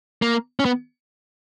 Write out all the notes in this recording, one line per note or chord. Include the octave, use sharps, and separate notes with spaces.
A#3
C#4
B3